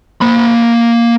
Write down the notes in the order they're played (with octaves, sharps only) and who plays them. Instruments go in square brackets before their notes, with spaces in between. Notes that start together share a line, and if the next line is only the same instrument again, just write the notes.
[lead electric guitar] A#3 B5